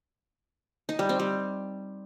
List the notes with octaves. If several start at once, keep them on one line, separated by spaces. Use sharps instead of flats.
D#4
G3
C4
G3